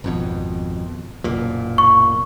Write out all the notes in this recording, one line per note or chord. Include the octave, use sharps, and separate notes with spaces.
G#1 F2 B2
F#1 B1 A#2
C#6